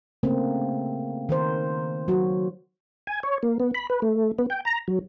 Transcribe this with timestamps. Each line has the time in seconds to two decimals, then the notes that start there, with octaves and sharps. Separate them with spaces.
0.23 C#3 A3 A#3 C4
1.29 D#3 A#4 C5
2.08 F#3 F#4
3.07 G#5
3.23 C#5
3.43 A#3
3.60 B3
3.74 B5
3.90 B4
4.02 A3
4.39 B3
4.50 G5
4.65 A#5
4.88 F#3